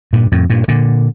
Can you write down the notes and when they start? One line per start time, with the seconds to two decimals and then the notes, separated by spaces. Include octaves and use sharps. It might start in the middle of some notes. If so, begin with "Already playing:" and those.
0.13 G2 A#2
0.32 F2 A2
0.50 G2 A#2
0.68 A#2 D3